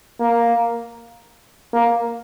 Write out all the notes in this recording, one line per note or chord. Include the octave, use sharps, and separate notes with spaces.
A#3
A#3